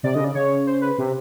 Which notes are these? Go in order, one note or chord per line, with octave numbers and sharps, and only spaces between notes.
C3 D5
D3 D#5
C#3 D5
C#3 C#5
C5
B4
C3